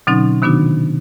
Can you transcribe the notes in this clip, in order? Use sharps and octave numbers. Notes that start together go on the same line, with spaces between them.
B2 D3 F#3 C4 C#4 D#4
C3 D#3 B3 D4 D#4 F#4